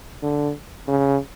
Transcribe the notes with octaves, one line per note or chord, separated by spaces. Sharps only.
D3
C#3